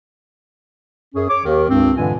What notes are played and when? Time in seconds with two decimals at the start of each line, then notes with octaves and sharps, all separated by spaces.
1.15 F#2 C#4 G#4
1.29 C#5 D6
1.45 D#2 D#3
1.69 C#2 G2 C4
1.97 G2 A#2 D3 E3 G#3 G#5